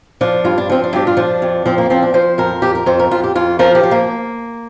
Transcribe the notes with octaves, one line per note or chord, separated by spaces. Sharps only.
F3 D4
G2 F4
D4
F3 C4
D4
G2 G4
F4
F3 D4
F2
F3 C4
A#3
F3 C4
D4
F3 C5
F2 A#4
F2 G4
A#4
F2 C5
A#4
F2 F4
G4
F2 F4
F3 A#4
G4
F3
A#3